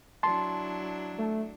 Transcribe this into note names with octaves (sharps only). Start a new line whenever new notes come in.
F#3 D4 E4 A5 C6
A3